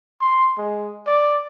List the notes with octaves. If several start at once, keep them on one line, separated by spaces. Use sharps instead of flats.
C6
G#3
D5